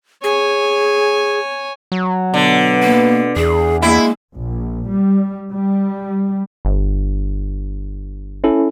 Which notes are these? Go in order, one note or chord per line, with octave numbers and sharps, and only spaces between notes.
G#4 C#5 G#5
F#3
B2 D3 B3
A#3
E2 G#4
G#3 A#3 E4
A#1
G3
G3
G1
C#4 E4 A4